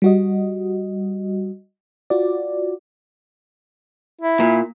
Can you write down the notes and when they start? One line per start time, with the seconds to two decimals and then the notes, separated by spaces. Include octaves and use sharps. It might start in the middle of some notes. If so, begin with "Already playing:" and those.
0.02 G3 F#4 D#5
2.10 F4 F#4 D5
4.21 E4
4.40 A#2